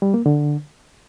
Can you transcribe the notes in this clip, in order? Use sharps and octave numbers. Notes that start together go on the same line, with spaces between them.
G3
A#3
D3